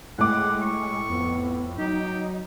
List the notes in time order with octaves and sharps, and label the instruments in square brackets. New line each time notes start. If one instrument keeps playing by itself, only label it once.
[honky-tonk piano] A2 D6 [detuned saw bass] G#3 [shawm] F#5
[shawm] C#6
[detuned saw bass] F2 [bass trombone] B3
[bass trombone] F#3 [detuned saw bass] D#4 [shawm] G4